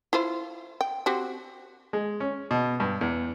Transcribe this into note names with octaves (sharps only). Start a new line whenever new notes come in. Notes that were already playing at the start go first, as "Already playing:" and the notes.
E4 F4 C5
G5
C4 F#4 G4
G#3
C#4
B2
G2
E2